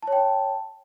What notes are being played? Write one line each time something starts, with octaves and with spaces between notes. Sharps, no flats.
C#5 G5 A5